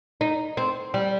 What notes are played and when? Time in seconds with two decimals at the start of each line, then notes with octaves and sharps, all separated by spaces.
0.21 D#4
0.57 C4
0.94 G3